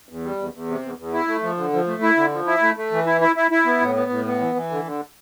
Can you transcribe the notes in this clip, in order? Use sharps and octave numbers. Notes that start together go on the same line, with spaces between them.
E2
G3
E2
E2
C3
E2
E2
E4
A3
F3
D3
F3
A3
E4
D3
F3
E4
A3
A3
E3
E4
E4
E4
E4
B3
A2
B3
A2
B3
E3
E3
D3
D3